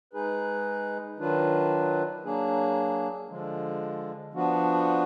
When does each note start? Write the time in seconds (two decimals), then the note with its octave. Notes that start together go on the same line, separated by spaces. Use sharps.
0.13 G#3 D#4 G#4 B4
1.19 D#3 F#3 D4 F4 B4
2.24 F#3 A#3 D4 G#4
3.28 D3 F3 G#3
4.33 F3 B3 D4 F#4